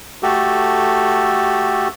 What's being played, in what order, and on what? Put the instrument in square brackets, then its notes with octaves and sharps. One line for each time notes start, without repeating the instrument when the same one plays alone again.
[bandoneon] A3 F#4 G4 A4